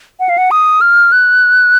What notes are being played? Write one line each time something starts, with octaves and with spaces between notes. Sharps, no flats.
F#5
F5
F#5
D#6
F6
F#6